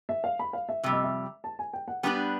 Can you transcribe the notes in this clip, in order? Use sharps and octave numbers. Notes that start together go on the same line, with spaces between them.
E5
F5
B5
F5
E5
F2 C3 G3
D#5
E5
A5
G#5
G5
F#5
G3 B3 D4 G4 B4 G5